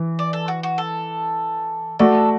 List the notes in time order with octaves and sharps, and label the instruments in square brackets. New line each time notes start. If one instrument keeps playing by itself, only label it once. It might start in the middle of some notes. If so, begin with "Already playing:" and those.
Already playing: [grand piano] E3
[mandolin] D5
A4
F#4
F#4
A4
[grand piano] A3 F#4 D5 [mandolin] A4